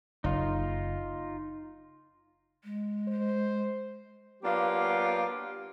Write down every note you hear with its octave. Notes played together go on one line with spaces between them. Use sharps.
F#1 D#4 F4
G#3
C5
F#3 A#3 B3 D4 F4 G4